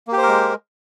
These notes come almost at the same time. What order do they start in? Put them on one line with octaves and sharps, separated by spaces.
A#3 G4 C5 A#4 G#3